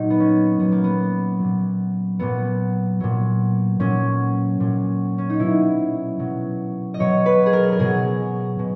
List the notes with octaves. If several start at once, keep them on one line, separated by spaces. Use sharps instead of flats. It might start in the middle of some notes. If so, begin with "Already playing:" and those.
Already playing: A#2 F#3 D#4
B3
C#4
A#2 F#3 B3
A#3
B3
A#2 F#3
A#2 F#3 B3
A#2 F#3
A#2 F#3 C#4
A#2 F#3
C#4
D#4
B2 F#3 E4
B2 F#3
D#5
B2 F#3 C#5
B4
G#4
A#4
A#4
B2 F#3 G#4
B2